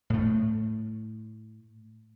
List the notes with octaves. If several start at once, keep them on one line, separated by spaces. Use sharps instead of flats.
A2 A3